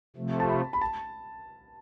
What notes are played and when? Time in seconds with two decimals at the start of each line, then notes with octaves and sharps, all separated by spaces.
0.16 C3 F3 A3
0.40 A5
0.49 B5
0.73 B5
0.81 A5